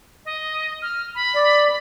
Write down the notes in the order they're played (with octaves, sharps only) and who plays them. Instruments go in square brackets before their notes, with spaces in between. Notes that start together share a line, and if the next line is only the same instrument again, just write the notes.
[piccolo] D#5
F6
B5
[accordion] D5